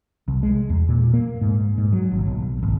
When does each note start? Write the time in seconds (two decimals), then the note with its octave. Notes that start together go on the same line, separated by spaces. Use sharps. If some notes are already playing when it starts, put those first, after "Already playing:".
0.28 C2
0.43 G#3
0.70 E2
0.89 A#2
1.13 A#3
1.41 G#2
1.78 G#2
1.93 F#3
2.12 G#1
2.27 B1
2.63 G#1